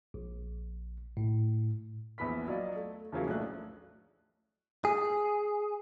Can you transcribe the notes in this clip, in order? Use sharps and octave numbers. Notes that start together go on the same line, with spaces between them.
A#1
A2
A#1 E2 B3 B5 B6
F#3 F4 D5 D#5
A3
E2 C#3 F3 F#3 A#3
B1 A2 D4 F#6
G#4